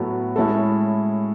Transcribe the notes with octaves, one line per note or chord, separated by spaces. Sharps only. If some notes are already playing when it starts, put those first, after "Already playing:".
Already playing: A2 F#3 B3 F#4 A4
A2 G#3 C#4 E4 A4